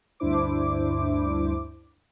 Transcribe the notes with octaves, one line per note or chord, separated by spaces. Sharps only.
D2 G2 D4 E4 C5 D6